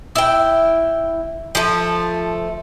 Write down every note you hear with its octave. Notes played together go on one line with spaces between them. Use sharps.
E4 G5
F3 A3